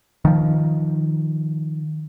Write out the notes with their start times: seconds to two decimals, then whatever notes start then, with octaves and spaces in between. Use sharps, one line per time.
0.25 D#3 F3